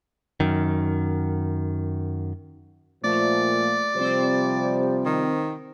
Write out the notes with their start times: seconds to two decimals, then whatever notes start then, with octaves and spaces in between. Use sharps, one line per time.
0.40 F#2 D#3
3.04 A#2 F3 A3 D5
3.96 C3 F3 G3 C4 C5
5.05 D#3